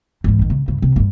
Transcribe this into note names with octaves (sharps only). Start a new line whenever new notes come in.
G#2 E3
A1 D#3
C#3
G2 C#3
C3
G2 C4